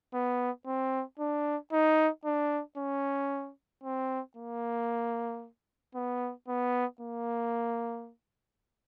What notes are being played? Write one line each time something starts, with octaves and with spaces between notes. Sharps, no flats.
B3
C4
D4
D#4
D4
C#4
C4
A#3
B3
B3
A#3